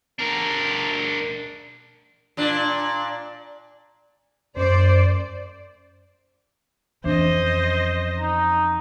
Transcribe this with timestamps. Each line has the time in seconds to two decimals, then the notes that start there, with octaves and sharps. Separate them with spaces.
0.19 D4 A#4
2.37 A#2 D4
4.56 F#2 C5 D5
7.04 F2 E3 C#4 D4 C5 D#5
8.19 D#4